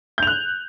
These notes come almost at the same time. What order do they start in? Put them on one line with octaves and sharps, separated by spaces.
G6 F7 F#6